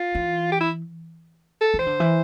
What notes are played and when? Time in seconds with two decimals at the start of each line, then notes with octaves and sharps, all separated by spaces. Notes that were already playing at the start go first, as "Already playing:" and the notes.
Already playing: F4
0.15 E3
0.52 G4
0.60 E4
1.61 A4
1.74 E3
1.79 C5
1.86 D3
2.00 E3